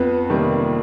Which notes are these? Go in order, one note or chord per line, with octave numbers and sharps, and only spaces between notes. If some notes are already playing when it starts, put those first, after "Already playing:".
Already playing: F2 B3 B4
C3 D#3 G3 A#3